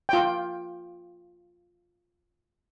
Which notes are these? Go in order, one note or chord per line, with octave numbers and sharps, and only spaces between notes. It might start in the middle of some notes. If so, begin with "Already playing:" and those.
F4 G5